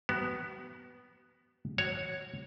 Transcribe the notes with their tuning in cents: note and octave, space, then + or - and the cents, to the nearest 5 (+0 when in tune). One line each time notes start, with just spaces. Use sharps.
B3 +0 F#4 +40 E5 +40
F#4 -5 C#5 +0